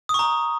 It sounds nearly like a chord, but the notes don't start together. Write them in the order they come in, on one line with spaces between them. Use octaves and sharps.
D#6 C#6 A#5